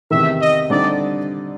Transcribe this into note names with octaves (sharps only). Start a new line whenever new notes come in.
E2 C3 D#3 E5
D#5
D3 G3 C4 D#4 G4 D5